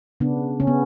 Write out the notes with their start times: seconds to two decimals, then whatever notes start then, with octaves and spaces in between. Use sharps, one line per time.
0.20 C#3 B3 D4
0.60 C#3 C#4
0.67 B3